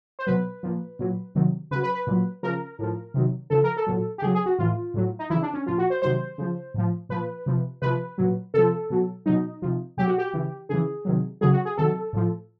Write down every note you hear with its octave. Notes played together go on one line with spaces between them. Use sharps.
C5
B2 F#3 B4
A#2 F3
A#2 F#3
C3 D#3 F#3
C#3 F#3 B4
B4
B4
A#2 F#3
C#3 F3 A#4
A2 F3
C3 D#3 F#3
C#3 F3 A4
A#4
A4
A#2 F#3
G4
C#3 F#3 G#4
G#4
F#4
A2 E3 F4
A2 F#3
D#4
C#3 E3 E4
D4
C#4
A#2 F3 F4
F#4
C5
C3 D#3 F#3 C5
C#3 F3
A2 F3
A#2 F3 B4
C3 F3
C3 F3 B4
A#2 F#3
C3 F3 A4
B2 F#3
B2 F#3 D#4
C3 F3
B2 F#3 G4
F#4
G4
C#3 E3
C#3 E3 G#4
C3 D#3 F#3
C#3 F#3 G#4
F#4
G#4
C3 D#3 F#3 A4
A2 F3